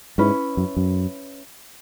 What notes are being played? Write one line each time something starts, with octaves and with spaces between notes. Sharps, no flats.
G#2 C#4 E4 B4
F#2
F#2